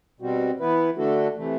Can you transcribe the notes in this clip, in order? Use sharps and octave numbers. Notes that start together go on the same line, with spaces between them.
B2 G3 C4 F#4
E3 B3 E4 B4
D3 A3 D4 F#4 A4
C3 E3 A3